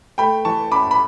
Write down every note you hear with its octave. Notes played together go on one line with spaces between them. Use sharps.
A3 G5 B5
E3 A5 C#6
F#2 B5 D6
B5